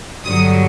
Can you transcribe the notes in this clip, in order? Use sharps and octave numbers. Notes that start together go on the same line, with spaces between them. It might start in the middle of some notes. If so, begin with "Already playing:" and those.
G2 D3 F#3 D#6